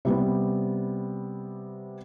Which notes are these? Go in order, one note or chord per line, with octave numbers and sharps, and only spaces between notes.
C3 G3 B3